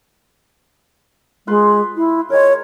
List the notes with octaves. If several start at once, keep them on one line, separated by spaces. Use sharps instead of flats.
G#3 F4 B4 C6
E4
G#3 A#4 C#5